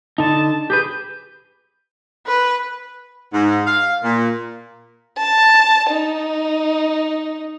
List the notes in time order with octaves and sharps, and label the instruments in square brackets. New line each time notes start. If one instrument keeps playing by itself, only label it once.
[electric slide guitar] D3 D#4 [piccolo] A5
[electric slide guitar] G4 G#4 B4 [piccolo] G6
[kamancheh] B4
[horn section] G#2
F5
A#2
[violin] A5
D#4